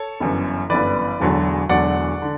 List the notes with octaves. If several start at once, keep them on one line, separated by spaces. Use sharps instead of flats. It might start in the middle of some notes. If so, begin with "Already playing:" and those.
Already playing: A4 C#5
G1 F#2 E3
G1 F#2 E3 B4 D5
E1 E2 D3 F#3
E1 E2 D3 F#3 D5 F#5
D3